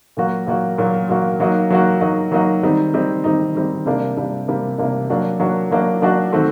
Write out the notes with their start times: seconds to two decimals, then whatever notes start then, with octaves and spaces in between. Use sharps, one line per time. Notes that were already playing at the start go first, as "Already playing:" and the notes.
0.17 A#2 F#3 A#3 F#4
0.47 A#2 F#3 A#3 F#4
0.78 A#2 F#3 A#3 F#4
1.09 A#2 F#3 A#3 F#4
1.40 F#3 A#3 D#4 F#4
1.70 F#3 A#3 D#4 F#4
2.01 F#3 A#3 D#4 F#4
2.32 F#3 A#3 D#4 F#4
2.63 D#3 G3 C4 D#4
2.94 D#3 G3 C4 D#4
3.24 D#3 G3 C4 D#4
3.55 D#3 G3 C4 D#4
3.86 C3 G3 A#3 D4
4.17 C3 G3 A#3 D4
4.48 C3 G3 A#3 D4
4.78 C3 G3 A#3 D4
5.10 F#3 A#3 D4 F#4
5.40 F#3 A#3 D4 F#4
5.71 F#3 A#3 D4 F#4
6.02 F#3 A#3 D4 F#4
6.33 D#3 A3 C4 F#4